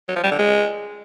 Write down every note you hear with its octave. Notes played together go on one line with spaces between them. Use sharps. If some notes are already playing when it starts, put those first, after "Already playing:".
F#3
F3
G3
D3
G#3